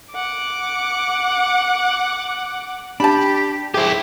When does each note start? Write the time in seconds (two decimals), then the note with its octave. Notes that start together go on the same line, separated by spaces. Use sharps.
0.11 F#5 D6
3.00 D4 G4 A5 B5
3.74 E4 G4 G#4 C5 E5